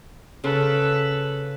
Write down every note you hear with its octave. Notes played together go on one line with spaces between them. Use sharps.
C#3 A4 B4